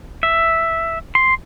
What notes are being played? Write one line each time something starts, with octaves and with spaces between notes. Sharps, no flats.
E5
C6